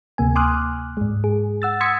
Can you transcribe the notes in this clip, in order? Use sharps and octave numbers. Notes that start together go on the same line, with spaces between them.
D2 C3 A#3 G#5
G#5 C6 D6 D#6 F6 F#6
G#2 G#3
G#4
F#5 E6 A6
C6 D#6 E6 G#6 B6 C#7